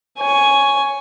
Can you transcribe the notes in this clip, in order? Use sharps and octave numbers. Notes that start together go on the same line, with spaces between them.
C#5 G#5